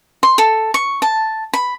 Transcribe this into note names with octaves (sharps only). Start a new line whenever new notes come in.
C6
A4
C#6
A5
B5